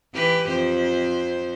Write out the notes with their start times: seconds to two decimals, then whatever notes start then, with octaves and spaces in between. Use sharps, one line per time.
0.14 E3 G4 B4
0.49 F2 C5